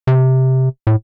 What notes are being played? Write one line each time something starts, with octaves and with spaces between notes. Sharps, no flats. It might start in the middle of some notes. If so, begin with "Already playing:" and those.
C3
A2